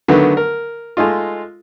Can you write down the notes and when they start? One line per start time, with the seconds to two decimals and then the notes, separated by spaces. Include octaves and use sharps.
0.08 D3 D#3 F#3 A3 B3
0.37 A#4
0.97 G#3 A3 D#4 F4